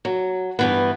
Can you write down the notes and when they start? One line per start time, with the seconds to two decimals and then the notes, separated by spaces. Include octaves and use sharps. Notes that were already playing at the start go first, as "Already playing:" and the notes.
0.05 F#3
0.59 G2 E3 B3